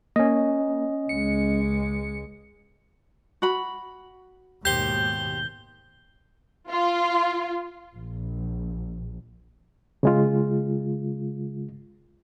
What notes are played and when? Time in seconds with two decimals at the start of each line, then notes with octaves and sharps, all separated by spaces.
0.16 A#3 C#4 D#5
1.09 C#2 G#3 C#7
3.42 F#4 B5
4.65 D#2 G#2 B2 G4 C5 G6 G7
6.70 F4
7.94 A#1
10.03 C#3 G#3 F4